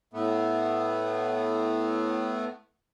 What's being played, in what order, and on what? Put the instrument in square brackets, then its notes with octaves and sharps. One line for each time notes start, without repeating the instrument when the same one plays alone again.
[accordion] A2 A3 B3